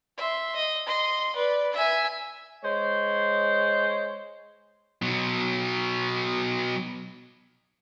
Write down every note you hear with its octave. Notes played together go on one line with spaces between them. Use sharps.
E5 C6
D#5
D#5 C6
B4 D5
E5 G#5
G#3 C5 C#5
B2 F#3